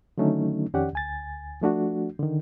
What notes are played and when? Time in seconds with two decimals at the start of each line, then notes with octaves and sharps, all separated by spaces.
0.18 D3 D#3 F#3 A3 C#4 D#4
0.74 F2 D#3 C#4 G4 D5 F#5
0.93 D2 G#5 A6
1.61 F3 A3 D4 F#4
2.19 D3 D#3